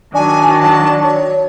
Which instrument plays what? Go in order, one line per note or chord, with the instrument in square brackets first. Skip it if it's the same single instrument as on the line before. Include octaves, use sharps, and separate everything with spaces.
[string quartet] D#3 F#3 [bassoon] D4 [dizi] G#5
[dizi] A5
C#5